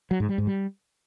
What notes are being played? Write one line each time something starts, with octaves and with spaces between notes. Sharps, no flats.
F#3
G#2
G3
G#2
G3